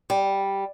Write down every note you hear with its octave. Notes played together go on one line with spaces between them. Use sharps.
G3